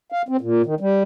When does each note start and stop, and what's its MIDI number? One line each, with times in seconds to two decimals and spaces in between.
0.12 0.22 77
0.29 0.37 60
0.41 0.62 46
0.66 0.75 51
0.80 1.03 55